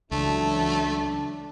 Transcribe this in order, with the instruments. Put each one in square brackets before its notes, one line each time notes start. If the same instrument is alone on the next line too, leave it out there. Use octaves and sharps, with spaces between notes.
[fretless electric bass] C#2 [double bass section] E3 F#3 [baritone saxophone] A3 [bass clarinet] D4